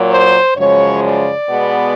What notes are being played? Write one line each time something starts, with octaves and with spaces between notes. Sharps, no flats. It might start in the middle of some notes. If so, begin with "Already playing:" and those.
Already playing: A#2 F#3 A#3
C5
F#2 C#3 F3 G#3 C#5
D5
B2 G#3 B3